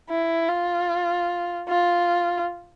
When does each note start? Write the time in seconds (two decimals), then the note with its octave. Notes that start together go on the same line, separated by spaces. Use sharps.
0.10 E4
0.48 F4
1.69 F4